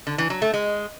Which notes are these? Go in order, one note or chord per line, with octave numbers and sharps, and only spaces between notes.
D3
E3
F#3
A3
G#3